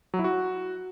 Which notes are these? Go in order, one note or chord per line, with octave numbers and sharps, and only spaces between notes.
F#3
E4
F#4